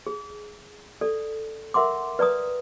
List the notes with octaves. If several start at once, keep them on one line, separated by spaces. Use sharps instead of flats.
G#4
A4 D5
A#4 E5 F#5 C6 D6
B4 D5 A#5 D#6